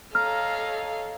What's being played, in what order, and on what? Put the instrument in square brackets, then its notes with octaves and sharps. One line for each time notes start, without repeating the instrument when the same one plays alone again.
[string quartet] A4 C#5 D#5 [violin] F5 [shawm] A#5 [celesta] F6